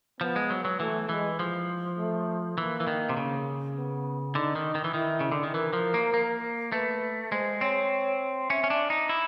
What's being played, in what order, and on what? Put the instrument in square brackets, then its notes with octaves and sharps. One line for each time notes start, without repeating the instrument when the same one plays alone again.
[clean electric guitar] F3 [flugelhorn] B3
[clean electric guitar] G#3
F#3
F#3
[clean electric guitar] E3 [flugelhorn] A3
[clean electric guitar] E3 [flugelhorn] G#3
[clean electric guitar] F3
[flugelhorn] A3
[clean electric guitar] E3 [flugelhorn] A#3
[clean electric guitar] E3
D#3
C3
C#3
[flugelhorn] B3
[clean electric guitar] D3 [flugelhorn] D#4
[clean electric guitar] D#3
D#3
E3
[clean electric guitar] D#3 [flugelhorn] E4
[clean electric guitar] C#3
D3
D#3
[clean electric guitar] E3 [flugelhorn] A#4
[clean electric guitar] F3
A#3
A#3
[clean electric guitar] A3 [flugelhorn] B4
[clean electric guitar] G#3 [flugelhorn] C5
[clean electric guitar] C4 [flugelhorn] C#5
[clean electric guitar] C#4 [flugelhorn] E5
[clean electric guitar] C#4
D4
D#4
E4